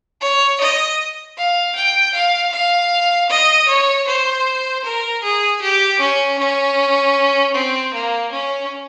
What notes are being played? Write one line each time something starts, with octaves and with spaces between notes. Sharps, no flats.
C#5
D#5
F5
G5
F5
F5
D#5
C#5
C5
A#4
G#4
G4
C#4
C#4
C4
A#3
C#4